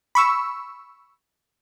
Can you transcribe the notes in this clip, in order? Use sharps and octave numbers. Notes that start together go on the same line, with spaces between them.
B5 C#6 E6